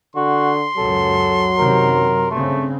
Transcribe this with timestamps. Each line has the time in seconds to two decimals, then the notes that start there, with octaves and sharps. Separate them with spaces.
0.16 D3 F#4 C6
0.77 C#2 F#2 F#3 A4
1.58 F#2 C3 D#3 A#4
2.31 G2 C#3 A3 C4